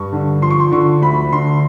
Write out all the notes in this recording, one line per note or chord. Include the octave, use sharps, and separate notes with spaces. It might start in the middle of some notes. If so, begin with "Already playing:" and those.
Already playing: G2 C#6
D3
F3 C6
C#6
C6
D3 C#6
D2 B5
D3 C6